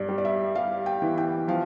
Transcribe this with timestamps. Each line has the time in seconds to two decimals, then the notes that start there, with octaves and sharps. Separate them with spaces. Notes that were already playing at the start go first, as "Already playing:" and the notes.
Already playing: G2 D5
0.09 G3
0.18 D5
0.25 E5
0.55 G3 F5
0.86 G5
1.02 E3
1.18 G5
1.48 F3 F5